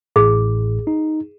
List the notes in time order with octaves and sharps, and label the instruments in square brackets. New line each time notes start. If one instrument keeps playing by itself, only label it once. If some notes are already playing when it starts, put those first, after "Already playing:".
[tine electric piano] A1 A2 [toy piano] G#4
[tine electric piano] D#4